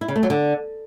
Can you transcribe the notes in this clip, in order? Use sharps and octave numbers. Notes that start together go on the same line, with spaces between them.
E4
C#3
A3
F#3
D3